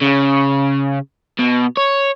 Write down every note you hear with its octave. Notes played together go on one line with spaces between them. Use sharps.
C#3
B2
C#5